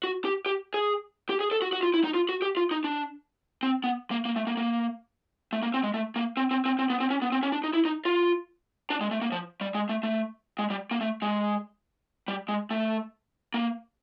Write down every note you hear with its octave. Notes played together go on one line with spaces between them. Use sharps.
F#4
G4
G4
G#4
G4
G#4
A4
F#4
F#4
F4
E4
D#4
F4
F#4
G4
F4
D#4
D4
C4
B3
A#3
A#3
A3
A#3
A#3
A3
A#3
C4
G#3
A3
A#3
C4
C4
C4
C4
B3
C4
C#4
B3
C4
C#4
D4
D#4
E4
D#4
F4
D4
G#3
A3
A#3
F3
G3
G#3
A3
A3
G#3
G3
A#3
A3
G#3
G3
G#3
A3
A#3